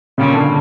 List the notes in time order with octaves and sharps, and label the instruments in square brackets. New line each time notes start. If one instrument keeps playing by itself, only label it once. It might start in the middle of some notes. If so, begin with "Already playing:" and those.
[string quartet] A#2 G3 C#4 [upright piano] C#3
[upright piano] D3